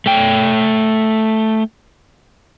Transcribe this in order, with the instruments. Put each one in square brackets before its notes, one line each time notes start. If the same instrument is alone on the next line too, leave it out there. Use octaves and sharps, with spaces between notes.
[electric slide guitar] A3 G5